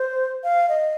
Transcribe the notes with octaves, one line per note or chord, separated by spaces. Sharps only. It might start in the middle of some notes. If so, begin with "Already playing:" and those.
Already playing: C5
F5
D#5